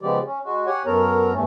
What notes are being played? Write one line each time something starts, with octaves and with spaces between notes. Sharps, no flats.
C#3 F3 G#3 B3 G4 D5
C#4
G#3 F#4
G4 C#5 F#5 G#5
F#2 B3 A4 A#4 C#5 A#5
E2 G2 A3 C#4